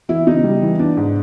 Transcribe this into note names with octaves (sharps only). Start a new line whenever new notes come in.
E3 E4
C#3 D#4
G3
E3
B3 D4
G#2